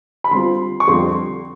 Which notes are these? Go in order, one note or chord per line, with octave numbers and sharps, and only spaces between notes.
B5
D3 G3 C4 F4 C6
C#6
F2 D3 G3 C4 C6